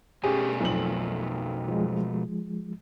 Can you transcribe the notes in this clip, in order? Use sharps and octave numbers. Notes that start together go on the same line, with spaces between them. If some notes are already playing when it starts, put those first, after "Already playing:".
B2 A3 C#4 G4 G#4 G#5
B1 F2 F#7
F3 G#3